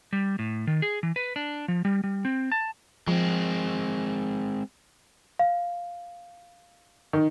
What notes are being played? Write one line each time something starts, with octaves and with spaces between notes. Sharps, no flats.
G3
A2
D#3
G#4
E3
B4
D4
F3
G3
G3
C4
A5
F3 G#3 C4
F5
D#3